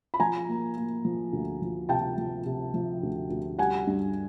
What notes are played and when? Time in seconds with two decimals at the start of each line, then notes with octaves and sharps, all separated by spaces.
0.14 B5
0.20 F3 G#5 A#5
0.48 A#3
0.76 A#3
1.05 F3
1.33 D2
1.62 F3
1.89 C3 G5 A5
2.18 F3
2.46 C3
2.74 F3
3.03 D2
3.30 D2
3.59 G3 F#5 G#5
3.87 G2